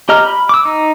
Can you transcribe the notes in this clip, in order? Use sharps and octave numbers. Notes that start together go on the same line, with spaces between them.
G4 D#5 A#5 F6
B5
D6 E6
D#4